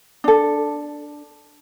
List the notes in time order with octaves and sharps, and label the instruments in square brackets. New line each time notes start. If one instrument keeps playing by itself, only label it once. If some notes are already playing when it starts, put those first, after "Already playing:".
[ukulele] D4 A4